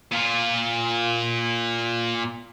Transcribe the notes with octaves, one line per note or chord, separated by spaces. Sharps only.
A#2 F4